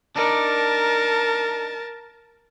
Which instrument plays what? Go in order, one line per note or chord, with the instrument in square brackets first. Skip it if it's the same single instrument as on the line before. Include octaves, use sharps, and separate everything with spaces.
[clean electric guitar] D4 D#4 D5 [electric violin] A#4 A5